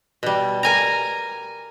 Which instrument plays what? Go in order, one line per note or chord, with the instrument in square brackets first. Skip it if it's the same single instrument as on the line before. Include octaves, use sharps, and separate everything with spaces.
[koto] B2 G3
A#4 G#5 A#5